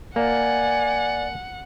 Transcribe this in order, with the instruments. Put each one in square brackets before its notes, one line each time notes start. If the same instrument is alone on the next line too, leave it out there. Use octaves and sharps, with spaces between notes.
[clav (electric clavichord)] A#3 [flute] D5 [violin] F#5 [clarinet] G#5